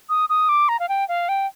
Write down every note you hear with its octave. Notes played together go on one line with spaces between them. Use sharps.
D#6
D#6
D6
A#5
F5
G5
F5
G5